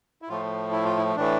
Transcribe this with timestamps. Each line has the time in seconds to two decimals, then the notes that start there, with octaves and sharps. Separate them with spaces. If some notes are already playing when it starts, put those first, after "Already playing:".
0.22 E4
0.28 A2 F3 A3 F4
0.72 E4
0.85 F4
0.97 E4
1.16 A2 E3 A3 D4